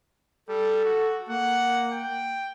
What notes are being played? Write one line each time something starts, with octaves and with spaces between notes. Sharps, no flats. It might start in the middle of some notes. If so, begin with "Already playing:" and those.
G3 A4
F#4
A#3 F#5
G5